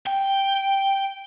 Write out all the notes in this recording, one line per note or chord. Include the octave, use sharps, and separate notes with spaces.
G5